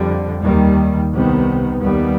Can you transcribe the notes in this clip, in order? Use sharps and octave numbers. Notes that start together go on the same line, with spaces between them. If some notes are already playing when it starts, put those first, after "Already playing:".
Already playing: F2 D3 G3
D#2 D#3 G3
C2 C3 D#3 B3
D#2 D#3 G3 B3